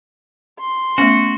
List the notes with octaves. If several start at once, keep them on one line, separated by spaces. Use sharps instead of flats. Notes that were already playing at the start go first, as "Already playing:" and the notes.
C6
A3 B3 C#4 F#4